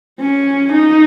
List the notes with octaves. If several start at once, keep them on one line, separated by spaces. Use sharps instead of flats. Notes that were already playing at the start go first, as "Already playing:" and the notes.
C#4
D#4